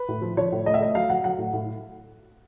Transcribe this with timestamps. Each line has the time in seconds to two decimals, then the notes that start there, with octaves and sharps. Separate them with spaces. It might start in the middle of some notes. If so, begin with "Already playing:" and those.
Already playing: B4
0.09 A2
0.22 F3
0.37 F3 C#5
0.52 A2
0.66 A3 D#5
0.74 E5
0.81 A3 D#5
0.95 F#3 F5
1.10 F#3 F#5
1.24 F#3 F#5
1.38 A2
1.53 A2